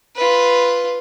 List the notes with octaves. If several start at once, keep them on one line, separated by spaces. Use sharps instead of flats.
F4 B4